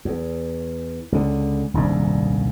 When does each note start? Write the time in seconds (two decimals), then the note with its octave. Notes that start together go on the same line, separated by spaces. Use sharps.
0.05 E2
1.12 C#2 D3
1.74 D#1 C2 G#2 D4